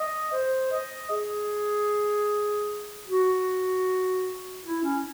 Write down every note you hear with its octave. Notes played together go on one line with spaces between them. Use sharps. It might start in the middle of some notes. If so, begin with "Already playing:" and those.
Already playing: D#5
C5
D#5
G#4
F#4
E4
C#4